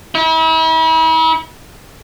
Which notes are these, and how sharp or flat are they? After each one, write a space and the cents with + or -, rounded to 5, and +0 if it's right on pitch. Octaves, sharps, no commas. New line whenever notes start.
E4 -40